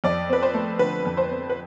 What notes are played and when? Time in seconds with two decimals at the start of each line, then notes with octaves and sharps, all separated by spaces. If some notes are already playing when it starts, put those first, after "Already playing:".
0.04 F2 D5
0.29 C4 B4
0.42 C5
0.54 A3
0.79 D3 B4
1.05 F2
1.17 C5
1.31 C4
1.50 B4